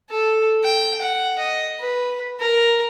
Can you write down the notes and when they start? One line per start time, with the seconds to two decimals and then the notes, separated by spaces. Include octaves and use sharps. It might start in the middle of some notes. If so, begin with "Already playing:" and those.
0.10 A4
0.64 G5
1.02 F#5
1.39 D#5
1.80 B4
2.40 A#4